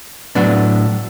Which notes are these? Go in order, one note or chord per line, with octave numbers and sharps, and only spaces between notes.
A2 F#3 B3 D4